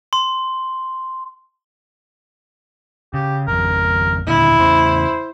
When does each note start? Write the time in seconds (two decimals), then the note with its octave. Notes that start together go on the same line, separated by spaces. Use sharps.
0.13 C6
3.14 C#3 G4
3.48 G#1 F2 A#4
4.27 D#2 A#2 D3 E4
4.59 E2 C#3 C5